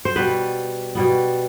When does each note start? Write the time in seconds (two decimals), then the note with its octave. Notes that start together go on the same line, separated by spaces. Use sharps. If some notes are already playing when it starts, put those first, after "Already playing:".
0.05 C5
0.16 B2 G3 B3 B4
0.95 B2 G3 B3